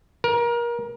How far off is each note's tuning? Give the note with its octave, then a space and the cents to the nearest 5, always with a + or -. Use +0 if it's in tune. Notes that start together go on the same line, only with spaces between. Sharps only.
A#4 +25